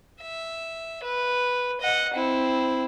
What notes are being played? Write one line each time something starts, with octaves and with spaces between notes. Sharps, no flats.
E5
B4
D#5 F#5
C4 E4